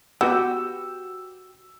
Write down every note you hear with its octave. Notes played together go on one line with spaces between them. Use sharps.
B3 F#4 G4 E6